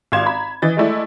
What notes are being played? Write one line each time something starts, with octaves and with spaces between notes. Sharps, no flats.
G#1 F4 F5 C6 G#6 E7
A#5 B5
E3 D#5 A6
G#3 A3 E4 D5